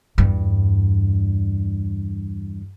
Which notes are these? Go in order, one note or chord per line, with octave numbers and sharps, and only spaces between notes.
E2 G2